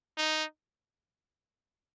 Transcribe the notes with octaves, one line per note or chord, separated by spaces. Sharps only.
D#4